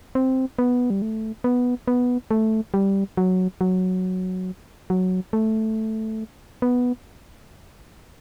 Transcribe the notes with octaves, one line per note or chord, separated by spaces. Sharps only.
C4
B3
G3
A3
B3
B3
A3
G3
F#3
F#3
F#3
A3
B3